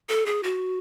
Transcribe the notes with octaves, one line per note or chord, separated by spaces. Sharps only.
A4
G#4
F#4